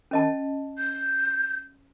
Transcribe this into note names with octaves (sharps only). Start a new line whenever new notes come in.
C#4 D#5 A5
G6